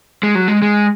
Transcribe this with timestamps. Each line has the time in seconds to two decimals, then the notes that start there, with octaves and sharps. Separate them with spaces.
0.23 G#3
0.35 F#3
0.48 G#3
0.62 G#3